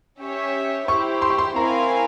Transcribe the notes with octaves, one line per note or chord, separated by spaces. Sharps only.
C#4 G4 C#5 E5
E4 G4 C5 C#6
C6
C#6
C6
C4 E4 A#4 F5 G#5 A#5